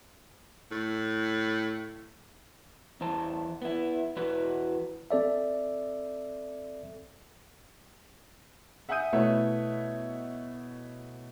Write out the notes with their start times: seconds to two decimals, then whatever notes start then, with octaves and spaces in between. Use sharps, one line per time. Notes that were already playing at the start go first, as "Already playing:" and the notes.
0.71 A2
3.01 E2 E3 C5 A5
3.62 B3 E4
4.16 E2 E4 F#4 B4
5.11 C4 A4 D5 E5
8.89 E5 F#5 G#5 D#6 G6 D#7
9.13 B2 A3 E4 B4 C#5 E5